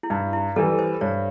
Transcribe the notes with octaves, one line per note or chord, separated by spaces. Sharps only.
E4
G2 D#4
E4
E3 G3 A4
C5
G2 C#5